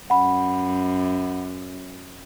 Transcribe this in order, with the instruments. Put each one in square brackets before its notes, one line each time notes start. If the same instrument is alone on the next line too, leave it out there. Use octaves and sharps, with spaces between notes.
[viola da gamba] F#2 [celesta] F#5 B5